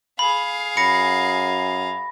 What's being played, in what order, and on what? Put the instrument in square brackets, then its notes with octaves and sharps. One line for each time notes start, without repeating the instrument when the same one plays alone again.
[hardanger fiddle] G#4 F5 [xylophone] B5
[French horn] F#2 [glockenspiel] B5 A#6 [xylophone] C#7